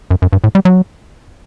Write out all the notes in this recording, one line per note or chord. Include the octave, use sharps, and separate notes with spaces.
F#2
F#2
G2
A2
G3
F#3